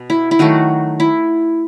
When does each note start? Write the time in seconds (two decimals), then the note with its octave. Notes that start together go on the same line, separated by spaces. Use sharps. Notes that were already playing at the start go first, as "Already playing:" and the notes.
Already playing: B2
0.10 E4
0.31 E4
0.39 D#3 F#3 A3 F#4
1.00 E4